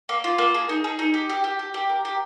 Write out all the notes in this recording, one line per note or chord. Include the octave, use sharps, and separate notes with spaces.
A#3
F4
A#3
G#4
D#4
G#4
D#4
G4
G4
G4
G4
G4
A#4
G4